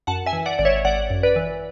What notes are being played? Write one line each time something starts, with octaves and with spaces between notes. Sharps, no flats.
F#2 F#5 A5
E5 G#5
E3
D5 F#5
G#1 D5
C#5 E5
G#1 D5 F#5
F#2
B4 D5
E3